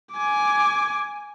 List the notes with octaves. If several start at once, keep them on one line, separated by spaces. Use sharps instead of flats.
G#5 D6